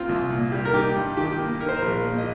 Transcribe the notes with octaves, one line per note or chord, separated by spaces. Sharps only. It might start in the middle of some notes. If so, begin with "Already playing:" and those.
Already playing: A#3 C4 F4
C2
A#2
G3
A#4
D#4 G4
G2
D#3 G4
A#3
D#4 A#4
C5
A#4
A#1
A#2
D#5